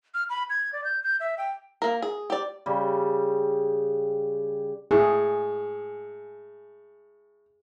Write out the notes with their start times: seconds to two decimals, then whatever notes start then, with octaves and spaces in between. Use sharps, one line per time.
0.14 F6
0.29 B5
0.50 G#6
0.73 D5
0.84 G6
1.03 G6
1.20 E5
1.38 G5
1.82 A#3 A#4
2.02 G#4
2.30 G4 D5
2.66 C#3 G3
4.91 A2 G#4